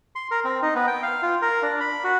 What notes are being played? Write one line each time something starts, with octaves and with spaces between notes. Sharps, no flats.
C6
A#4
C4
D#4
B3
G5
F5
F4
A#4
D4
B5
F#4